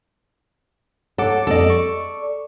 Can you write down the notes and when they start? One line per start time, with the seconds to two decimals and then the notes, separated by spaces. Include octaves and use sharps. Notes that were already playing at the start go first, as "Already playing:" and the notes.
1.18 A4 C#5 F#5 D6
1.47 F2 A4 D5 D#5
1.70 C#6